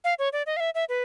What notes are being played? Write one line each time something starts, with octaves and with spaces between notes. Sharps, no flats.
F5
C#5
D5
D#5
F5
E5
E5
B4